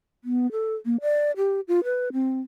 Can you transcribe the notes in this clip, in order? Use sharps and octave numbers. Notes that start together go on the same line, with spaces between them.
B3
A4
A#3
D5
G4
F4
B4
C4